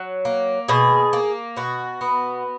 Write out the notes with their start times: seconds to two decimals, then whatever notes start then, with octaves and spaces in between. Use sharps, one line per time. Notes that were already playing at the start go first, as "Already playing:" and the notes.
Already playing: F#3
0.25 A#3
0.68 B2 G#4
1.13 A#3
1.57 B2 F#4
2.01 B3